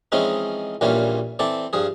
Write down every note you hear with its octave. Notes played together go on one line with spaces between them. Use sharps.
E3 F3 G#3 C4 C#4 D#4
A#1 A#2 E3 G3 C#4 F4
E3 C4 A4 D5
G2 F3 G#4